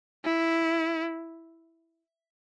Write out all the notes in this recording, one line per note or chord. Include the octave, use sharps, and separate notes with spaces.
E4